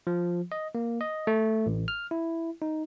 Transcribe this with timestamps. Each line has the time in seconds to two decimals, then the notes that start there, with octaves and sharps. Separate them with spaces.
0.07 F3
0.52 D#5
0.75 A#3
1.01 D#5
1.27 A3
1.66 A1
1.88 F6
2.11 E4
2.62 D#4